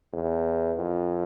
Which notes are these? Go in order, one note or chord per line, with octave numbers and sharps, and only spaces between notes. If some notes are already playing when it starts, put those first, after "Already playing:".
E2
F2